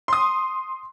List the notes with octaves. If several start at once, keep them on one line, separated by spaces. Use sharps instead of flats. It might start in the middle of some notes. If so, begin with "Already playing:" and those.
C6 D#6